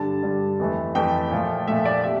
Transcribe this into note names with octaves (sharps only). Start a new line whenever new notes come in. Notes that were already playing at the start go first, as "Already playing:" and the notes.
Already playing: G2 D3 G3 A5
G2 D3 G3
F2 E3 A3
F2 E3 A3 G5
A#2 F3 A3
A#2 F3 A3 E5
D5
C3 E5